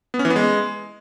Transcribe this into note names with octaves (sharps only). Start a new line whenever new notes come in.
B3
C#4
E3
B3
G#3